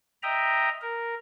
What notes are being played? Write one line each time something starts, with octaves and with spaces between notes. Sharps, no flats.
D#5 E5 G5 A#5
A#4